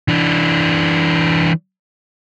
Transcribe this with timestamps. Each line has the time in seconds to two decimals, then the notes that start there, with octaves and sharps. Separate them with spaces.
0.08 E3 D4